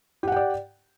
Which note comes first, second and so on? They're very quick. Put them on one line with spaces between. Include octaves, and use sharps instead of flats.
G4 F#5 G5 D5